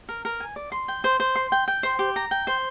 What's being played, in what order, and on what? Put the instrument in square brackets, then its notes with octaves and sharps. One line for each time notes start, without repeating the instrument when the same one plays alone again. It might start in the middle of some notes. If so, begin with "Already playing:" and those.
[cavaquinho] A#4
A#4
G#5
D5
C6
G5
C5
C5
C6
G5
G5
C5
G4
A#5
G5
C5